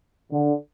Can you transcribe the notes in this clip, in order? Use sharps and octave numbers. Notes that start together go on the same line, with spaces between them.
D3